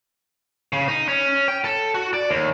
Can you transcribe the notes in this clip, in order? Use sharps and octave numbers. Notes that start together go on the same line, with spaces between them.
C#3
D#4
C#4
G5
A4
F#4
D5
D#2